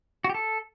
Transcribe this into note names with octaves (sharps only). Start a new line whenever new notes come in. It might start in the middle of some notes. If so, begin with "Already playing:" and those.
F#4
G4
A4